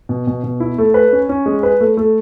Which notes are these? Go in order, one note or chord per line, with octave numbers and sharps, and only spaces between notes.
B2
B2
B2
E4
A3
B4
C#4
C#4
G#3
B4
A3
A3